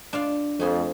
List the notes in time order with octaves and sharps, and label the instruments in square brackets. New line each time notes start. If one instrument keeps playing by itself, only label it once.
[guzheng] D4 F4 F5
[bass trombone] F2 [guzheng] A3 G#4 C5